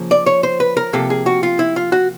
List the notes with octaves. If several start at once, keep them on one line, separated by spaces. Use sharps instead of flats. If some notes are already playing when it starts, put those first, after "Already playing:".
Already playing: C#3 F3 A#3
D5
C#5
C5
B4
A#4
C3 F3 A#3 A4
G#4
F#4
F4
E4
F4
F#4